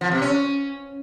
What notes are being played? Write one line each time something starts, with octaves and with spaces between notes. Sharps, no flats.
F3
C3
C#4